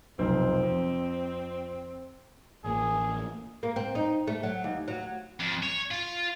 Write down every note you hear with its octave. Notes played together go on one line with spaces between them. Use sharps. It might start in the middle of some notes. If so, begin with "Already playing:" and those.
F1 B1 C4 C5
F2
A1 A#3 G#4
A#3
C4
D#4
A3
F#3
D#2
F#3
F2
C#5
F4